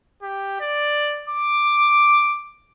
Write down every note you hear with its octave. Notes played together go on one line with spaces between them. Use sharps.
G4
D5
D6